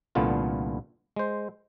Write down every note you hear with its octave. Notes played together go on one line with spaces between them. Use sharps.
C2 A#2 D3 A3 B3 F4
G#3 C5